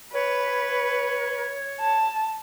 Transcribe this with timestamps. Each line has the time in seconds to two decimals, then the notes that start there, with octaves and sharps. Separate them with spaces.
0.13 B4 C#5
1.80 A5